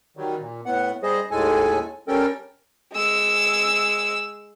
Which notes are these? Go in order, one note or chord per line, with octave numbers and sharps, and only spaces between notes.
D#3 F#3 G3
A#2
A2 B3 F#5
G3 G#4 C5 D#5
D#2 A2 G#3 A4 G#5
G3 C#4 A4 A#4 G5
G#3 E6